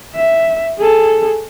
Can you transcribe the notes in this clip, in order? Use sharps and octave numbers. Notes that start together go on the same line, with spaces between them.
E5
G#4 A4